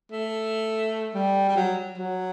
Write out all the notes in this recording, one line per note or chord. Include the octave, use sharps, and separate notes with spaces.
A3
G3
G3
F#3
F#3